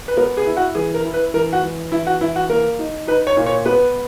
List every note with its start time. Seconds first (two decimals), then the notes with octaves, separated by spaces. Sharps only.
0.08 B4
0.17 B3 A#4
0.37 G#4
0.46 E4
0.57 F#4
0.75 E3 G#4
0.94 A#4
1.05 E4
1.14 B4
1.34 E3 A#4
1.53 F#4
1.63 E3
1.92 E3 E4
2.07 F#4
2.21 E3 E4
2.36 F#4
2.49 A#3 A#4
2.79 D#4
3.08 D#4 B4
3.27 C#5
3.37 A#2
3.46 C#5
3.66 B3 B4